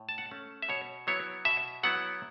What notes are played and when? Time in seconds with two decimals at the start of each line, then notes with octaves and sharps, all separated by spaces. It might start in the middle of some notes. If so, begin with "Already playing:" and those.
Already playing: A2
0.09 A5
0.18 F#5
0.31 A3 C#4
0.62 E5
0.69 B2 C#5
1.07 F#3 B3 E4 C#5
1.45 B2 E5
1.83 F#3 B3 E4 F#5